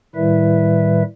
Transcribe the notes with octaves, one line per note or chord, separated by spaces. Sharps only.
A2 D#3 G3 E4 B4 E5